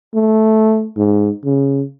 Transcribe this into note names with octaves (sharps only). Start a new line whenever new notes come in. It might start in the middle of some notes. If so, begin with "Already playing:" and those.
A3
G#2
C#3